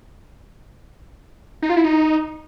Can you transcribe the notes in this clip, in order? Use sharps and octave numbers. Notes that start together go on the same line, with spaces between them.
D#4
F4
E4
D#4